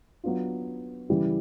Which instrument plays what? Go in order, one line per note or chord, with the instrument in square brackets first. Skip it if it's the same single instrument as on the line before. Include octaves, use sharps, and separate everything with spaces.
[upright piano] F#3 B3 D4 F4
C#3 E3 G3